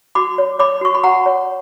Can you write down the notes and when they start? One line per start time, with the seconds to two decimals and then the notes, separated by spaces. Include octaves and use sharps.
0.15 F#4 B5 D6
0.38 C#5
0.59 C#5 B5 D6
0.81 F#4 C#6
0.94 B5
1.03 F#4 F#5 A#5
1.26 C#5